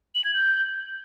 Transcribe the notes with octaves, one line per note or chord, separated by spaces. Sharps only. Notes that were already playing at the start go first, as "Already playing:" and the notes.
F#7
G#6
G6